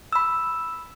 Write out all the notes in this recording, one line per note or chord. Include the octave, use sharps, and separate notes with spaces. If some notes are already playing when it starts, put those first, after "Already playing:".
B5 E6